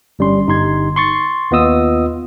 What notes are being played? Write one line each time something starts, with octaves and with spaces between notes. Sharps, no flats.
G1 G3 C#4 C6
G1 D#4 G4 C6 G#6
C6 C#6 A6
D#2 B3 F4 D#5 D#6 E6